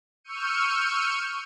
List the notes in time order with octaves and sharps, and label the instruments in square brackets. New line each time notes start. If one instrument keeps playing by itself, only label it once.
[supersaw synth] C#6 E6 F6 G6 C#7 D#7